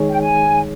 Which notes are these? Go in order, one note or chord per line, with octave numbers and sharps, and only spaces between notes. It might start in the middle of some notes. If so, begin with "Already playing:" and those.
Already playing: D#3 G#3 D#4 G#4 C#5
G5
G#5